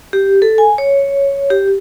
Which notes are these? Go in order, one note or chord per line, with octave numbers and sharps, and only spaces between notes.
G4
A4
G#5
C#5
G4